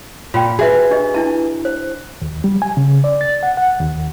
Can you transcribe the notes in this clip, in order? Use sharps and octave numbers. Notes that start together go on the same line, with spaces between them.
A#2 F4 G5
F#4 G#4 B4 E5
D4 G4 D#5
D4 E4 A5
C5
D#2
G3
G#5
C#3
D5
A6
F#5
F#5
D#2